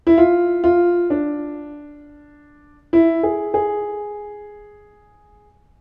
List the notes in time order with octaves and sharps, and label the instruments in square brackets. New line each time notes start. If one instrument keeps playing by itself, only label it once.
[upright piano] E4
F4
F4
D4
E4
G#4
G#4